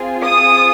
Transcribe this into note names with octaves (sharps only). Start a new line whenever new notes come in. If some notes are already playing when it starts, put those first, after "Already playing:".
Already playing: C4 F4 G#4
D#6